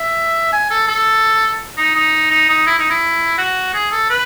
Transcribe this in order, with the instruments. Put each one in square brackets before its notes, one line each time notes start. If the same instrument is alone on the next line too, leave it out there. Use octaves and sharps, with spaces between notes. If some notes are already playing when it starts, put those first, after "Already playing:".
Already playing: [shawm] E5
G#5
A4
A4
D#4
D#4
D#4
D#4
E4
D#4
E4
F#4
G#4
A4
B4